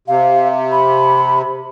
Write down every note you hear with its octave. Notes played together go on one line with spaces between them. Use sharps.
C3 F5
B5